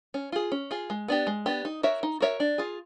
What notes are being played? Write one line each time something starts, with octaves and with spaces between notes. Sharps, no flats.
C#4
F4 G#4
C#4
F4 G#4
G#3
B3 D4 G4
G#3
B3 D4 G4
D#4
F#4 A#4 C#5 E5
D#4
F#4 A#4 C#5 E5
D4
F4 G#4